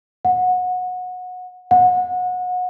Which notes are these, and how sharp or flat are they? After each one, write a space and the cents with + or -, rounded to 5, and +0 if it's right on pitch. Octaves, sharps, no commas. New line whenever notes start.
F#5 -20
F#5 -25